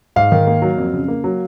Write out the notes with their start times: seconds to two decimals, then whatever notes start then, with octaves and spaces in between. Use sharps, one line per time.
0.16 G#2 F5
0.32 D#3
0.47 A#3
0.62 F#3
0.77 F2
0.94 C#3
1.08 A#3
1.24 F#3